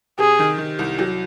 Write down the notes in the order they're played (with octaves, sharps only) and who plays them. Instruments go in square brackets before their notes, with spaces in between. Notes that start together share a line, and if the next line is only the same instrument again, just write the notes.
[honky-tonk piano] C3 [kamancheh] G#4
[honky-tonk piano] D#3
D#3
C2
F#3